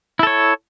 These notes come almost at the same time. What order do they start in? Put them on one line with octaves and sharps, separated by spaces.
E4 A4 C#5